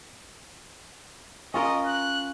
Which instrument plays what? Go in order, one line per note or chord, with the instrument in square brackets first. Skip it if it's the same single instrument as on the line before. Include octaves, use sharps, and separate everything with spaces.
[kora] C#4 F4 A#4 [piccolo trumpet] D#5
[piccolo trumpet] F#6